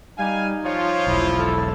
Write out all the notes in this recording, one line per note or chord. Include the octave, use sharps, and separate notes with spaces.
G3 D#4 F5 G#5
F3 F4 C#5
E1 B1 E4
A4